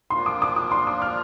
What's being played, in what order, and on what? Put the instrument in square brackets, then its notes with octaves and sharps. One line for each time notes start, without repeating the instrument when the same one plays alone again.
[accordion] A#2 F3 A#3 D4 F4 [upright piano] C6
[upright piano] D6
D6
D6
C6
D6
F6